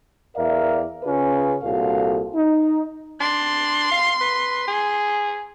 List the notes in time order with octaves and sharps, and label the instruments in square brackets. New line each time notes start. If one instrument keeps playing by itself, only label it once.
[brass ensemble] E2 A#4 D5 E5 F5
C#3 C#4 F4 G#4 B4
C2 A#2 F#4 A4 F5
D#4
[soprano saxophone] D4 [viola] C6
[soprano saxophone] F5
B4
G#4